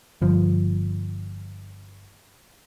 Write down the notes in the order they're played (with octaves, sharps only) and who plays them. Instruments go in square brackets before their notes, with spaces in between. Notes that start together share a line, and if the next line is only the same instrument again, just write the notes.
[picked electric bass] G1 F3